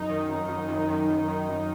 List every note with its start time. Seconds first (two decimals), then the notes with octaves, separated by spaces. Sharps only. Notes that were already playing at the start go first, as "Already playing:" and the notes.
Already playing: F#2 D#4
0.09 D#3
0.29 F#2
0.48 F#2
0.68 F#2
0.88 D#3
1.08 F#2
1.28 D#3
1.49 F#2